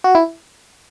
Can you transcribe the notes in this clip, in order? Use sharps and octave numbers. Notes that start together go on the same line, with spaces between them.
F#4
E4